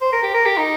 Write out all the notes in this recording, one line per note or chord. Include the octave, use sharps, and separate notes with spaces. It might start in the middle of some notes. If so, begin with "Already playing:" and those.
C5
A#4
G4
A#4
G4
D#4